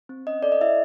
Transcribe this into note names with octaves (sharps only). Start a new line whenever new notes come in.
C4
C#4 D#5
A4 D5
D#5
E4 E5